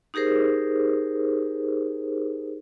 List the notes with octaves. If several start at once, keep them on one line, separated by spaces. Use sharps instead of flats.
D#4 G4 G#4 A#4 C5